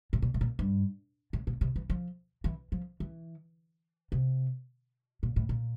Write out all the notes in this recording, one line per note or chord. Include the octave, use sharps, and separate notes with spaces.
A2
A#2
A2
A#2
G2
A2
A#2
C3
E3
F3
E3
F3
E3
C3
A#2
A2
A#2